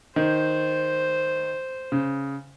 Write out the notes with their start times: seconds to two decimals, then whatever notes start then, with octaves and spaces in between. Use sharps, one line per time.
0.16 D#3 C5
1.92 C#3